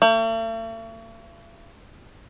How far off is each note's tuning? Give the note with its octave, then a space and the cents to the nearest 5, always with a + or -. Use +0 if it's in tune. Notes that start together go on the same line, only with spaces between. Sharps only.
A3 +45